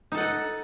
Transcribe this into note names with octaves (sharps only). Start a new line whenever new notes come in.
D#4 A4 D#5 F#5